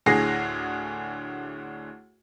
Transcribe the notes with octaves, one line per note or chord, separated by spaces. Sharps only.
D2 A2 D3 G#4 A#6 C7